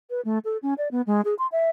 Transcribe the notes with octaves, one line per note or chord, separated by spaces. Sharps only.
B4
A3
A4
C#4
D5
B3
G#3
G#4
C6
E5